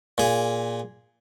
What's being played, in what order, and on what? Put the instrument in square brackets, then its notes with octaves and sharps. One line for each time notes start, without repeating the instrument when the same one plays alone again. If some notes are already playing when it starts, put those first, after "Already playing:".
[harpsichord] A#2 G#4